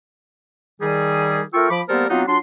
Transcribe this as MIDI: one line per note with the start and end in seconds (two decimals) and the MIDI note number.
0.81 1.42 51
0.81 1.42 55
0.81 1.42 68
1.53 1.67 57
1.53 1.67 65
1.53 1.67 70
1.53 1.67 79
1.53 1.67 85
1.53 1.67 88
1.70 1.82 53
1.70 1.82 83
1.70 1.82 86
1.88 2.06 55
1.88 2.06 58
1.88 2.06 59
1.88 2.06 69
1.88 2.06 70
1.88 2.06 72
2.09 2.23 54
2.09 2.23 59
2.09 2.23 60
2.09 2.23 62
2.09 2.23 63
2.09 2.23 65
2.28 2.37 54
2.28 2.37 62
2.28 2.37 65
2.28 2.37 84